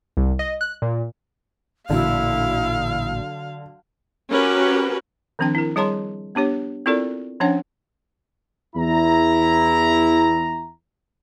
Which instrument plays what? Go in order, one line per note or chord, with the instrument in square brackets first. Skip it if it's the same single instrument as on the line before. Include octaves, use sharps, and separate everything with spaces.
[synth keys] C2
D#5
F#6
A#2
[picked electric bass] A1 A#2 [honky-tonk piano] D3 F#3 [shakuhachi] E4 [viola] F5
[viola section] C#4 F#4 G4 A#4 B4
[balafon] D#3 F3 C4 D4 G5
E4 A#4
G3 G#4 C#5 A5 A#5 C6
B3 D4 G4 C#5
C4 E4 F4 A4 A#4 D5
F3 C#4 D4 C#5 F#5
[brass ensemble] E2 E4 A#5